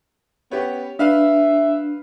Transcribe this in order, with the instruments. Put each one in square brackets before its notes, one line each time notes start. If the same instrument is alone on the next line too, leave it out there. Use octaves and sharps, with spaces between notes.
[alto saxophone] B3 [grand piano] C#4 G4 C#5
[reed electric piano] D4 [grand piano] B4 F5 F6 [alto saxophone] E5